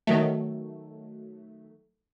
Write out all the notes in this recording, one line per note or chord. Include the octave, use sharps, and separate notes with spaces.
D#3 F#3 A3